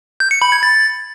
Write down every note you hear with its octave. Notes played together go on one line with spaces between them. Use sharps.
G6
C#7
B5
G#6
A6